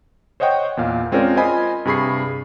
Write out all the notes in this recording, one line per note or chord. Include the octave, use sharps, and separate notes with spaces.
C5 C#5 D#5 F#5 G5 C#6
E2 A#2 F5
G#3 C4 C#4 F4 A#4 D5
F4 C5 D#5 G#5 B5
G2 C3 G#4 B5 C#6 C7